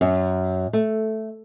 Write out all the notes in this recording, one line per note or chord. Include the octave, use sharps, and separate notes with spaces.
F#2
A3